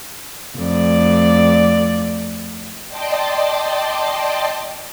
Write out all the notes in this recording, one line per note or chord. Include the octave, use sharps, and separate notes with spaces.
F2 A3 D5
D5 D#5 G5 A5 C6 D6